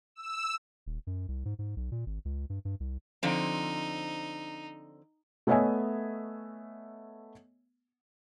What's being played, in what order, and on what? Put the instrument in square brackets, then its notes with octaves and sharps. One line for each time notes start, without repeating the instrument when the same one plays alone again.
[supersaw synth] E6
[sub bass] D#1
F#2
C2
G#2
G#2
B1
A#2
G#1
C#2
G2
G2
C2
[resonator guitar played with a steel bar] D3 F3 C4 [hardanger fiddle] D#4
[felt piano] A3 B3 C#5 D#5 E5 G#5